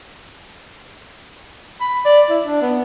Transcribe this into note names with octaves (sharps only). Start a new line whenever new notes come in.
B5
D5
E4
D4
B3